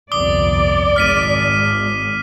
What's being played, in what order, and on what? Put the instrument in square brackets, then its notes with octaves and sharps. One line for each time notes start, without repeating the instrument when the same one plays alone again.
[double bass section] G1 C2 F2 [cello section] D5 [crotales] D6 D#6 G7
[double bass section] G#1 [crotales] F6 B6 D#7